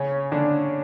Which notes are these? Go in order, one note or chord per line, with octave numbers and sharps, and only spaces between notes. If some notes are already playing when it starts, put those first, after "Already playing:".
Already playing: C#3 C#4
D3 D4